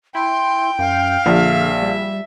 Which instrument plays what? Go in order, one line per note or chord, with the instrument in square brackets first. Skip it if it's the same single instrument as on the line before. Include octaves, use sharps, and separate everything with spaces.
[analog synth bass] E4 [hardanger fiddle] G5 [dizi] C6
[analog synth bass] F#2 [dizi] F5
[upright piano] A#1 [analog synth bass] D3 [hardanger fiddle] E5
[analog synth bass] G3